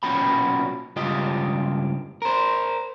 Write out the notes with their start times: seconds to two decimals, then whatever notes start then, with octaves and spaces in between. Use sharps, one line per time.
0.03 B1 A#2 C#4 F#4 G5 B5
0.96 C#2 G2 F4 G4 D#5
2.22 A#4 C5